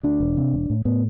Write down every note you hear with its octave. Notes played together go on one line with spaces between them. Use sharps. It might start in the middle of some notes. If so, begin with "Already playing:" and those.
D2 D4
E1
C3
E1
A2
A2 B3